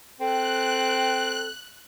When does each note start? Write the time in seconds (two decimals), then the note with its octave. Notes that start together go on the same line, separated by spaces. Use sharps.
0.20 C4 A4 G5 F#6